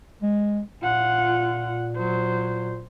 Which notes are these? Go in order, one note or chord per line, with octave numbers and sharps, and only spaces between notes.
G#3
A#2 F4 F#5
F#3 C5